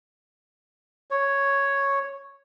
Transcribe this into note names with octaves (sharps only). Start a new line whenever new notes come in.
C#5